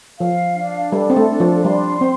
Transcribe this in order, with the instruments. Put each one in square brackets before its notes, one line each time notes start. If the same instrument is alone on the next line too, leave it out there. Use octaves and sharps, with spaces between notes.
[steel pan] F3 [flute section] F5
[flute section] D4
[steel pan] G3 [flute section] A4
[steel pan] C4
A3
[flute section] D4
[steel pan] F3
[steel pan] G3 [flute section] C6
[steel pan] C4 [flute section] C5